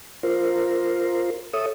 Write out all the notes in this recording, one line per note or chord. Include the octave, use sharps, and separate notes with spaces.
F4 A#4 C5
A4 C#5 E5 D#6